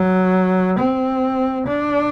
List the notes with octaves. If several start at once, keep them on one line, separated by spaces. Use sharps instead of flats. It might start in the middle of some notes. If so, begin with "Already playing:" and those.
Already playing: F#3
C4
D4